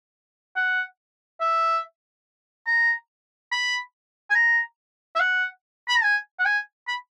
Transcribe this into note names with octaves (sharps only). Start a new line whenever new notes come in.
F#5
E5
A#5
B5
G#5
A#5
E5
F#5
B5
A#5
G#5
F#5
G#5
B5